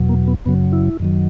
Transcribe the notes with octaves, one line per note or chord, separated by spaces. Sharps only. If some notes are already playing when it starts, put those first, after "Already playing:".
Already playing: E2 B2 F#3
A#3
B3
F#2 C#3 F#3 B3
E4
F#2 D#3 F#3